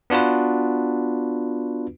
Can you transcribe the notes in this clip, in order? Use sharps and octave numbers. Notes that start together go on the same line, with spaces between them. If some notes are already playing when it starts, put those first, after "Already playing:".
B3 D4 F4 F#4 B4